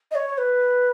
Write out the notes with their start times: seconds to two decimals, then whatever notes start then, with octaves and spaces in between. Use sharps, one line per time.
0.11 D#5
0.15 C#5
0.33 C#5
0.38 B4